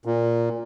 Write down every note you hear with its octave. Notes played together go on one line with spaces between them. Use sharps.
A#2